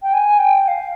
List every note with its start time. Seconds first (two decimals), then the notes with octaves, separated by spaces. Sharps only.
0.03 G5
0.13 G#5
0.38 G5
0.63 G5
0.68 F5